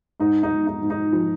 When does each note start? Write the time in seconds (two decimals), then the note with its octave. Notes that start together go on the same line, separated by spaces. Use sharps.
0.20 G#2 D#4
0.43 D#4
0.51 G#2
0.67 D#4
0.82 G#2
0.90 D#4
1.13 F3